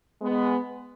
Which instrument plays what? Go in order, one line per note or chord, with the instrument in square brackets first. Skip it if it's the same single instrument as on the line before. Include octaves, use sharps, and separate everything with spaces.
[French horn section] G#3 B3